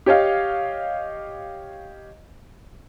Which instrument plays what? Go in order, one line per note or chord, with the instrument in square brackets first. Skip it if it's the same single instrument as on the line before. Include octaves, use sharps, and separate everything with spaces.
[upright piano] G4 C#5 D#5 F5